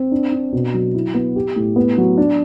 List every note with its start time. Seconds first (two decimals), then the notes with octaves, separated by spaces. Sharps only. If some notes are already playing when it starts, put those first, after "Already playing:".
Already playing: C4
0.11 D4
0.32 D4
0.52 B2
0.74 F#3
0.94 E4
1.14 B3
1.36 G4
1.56 A2
1.76 B3
1.98 F#3
2.17 D4